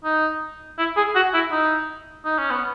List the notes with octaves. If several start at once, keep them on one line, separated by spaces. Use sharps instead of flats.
D#4
E4
G#4
F#4
E4
D#4
D#4
C#4
B3